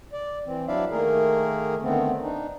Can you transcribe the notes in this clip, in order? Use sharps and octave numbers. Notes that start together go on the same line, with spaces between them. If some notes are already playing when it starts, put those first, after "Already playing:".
D5
E3 C4
F#3 D4 E4 D5 E5 F5
D#3 A3 A#3 G#4 A#4
D3 D#3 A3 B3 C4
D4 D#4